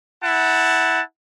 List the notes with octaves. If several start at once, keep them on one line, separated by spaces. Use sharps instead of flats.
E4 F#5 A5